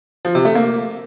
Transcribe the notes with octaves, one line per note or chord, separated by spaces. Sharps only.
F3
C3
A3
A#3